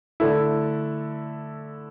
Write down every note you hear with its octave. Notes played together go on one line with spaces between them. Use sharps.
D3 A3 E4